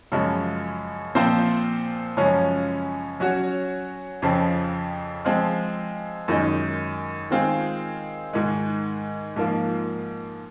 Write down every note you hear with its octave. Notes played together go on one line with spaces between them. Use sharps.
F#2 C#3 F3 G#3
A#2 F3 C4 F4 C5
F#2 C#3 F3 G#3 C#4
F#3 C#4 F#4 C#5
F2 C#3 F3 C4
F3 G#3 C4 F4
F#2 D#3 G#3 D#4
D#3 G#3 C4 F4 G#4
G#2 D#3 G#3
G#2 F3 A#3 F4